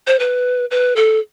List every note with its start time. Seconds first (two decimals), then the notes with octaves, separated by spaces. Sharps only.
0.07 C5
0.20 B4
0.71 B4
0.96 A4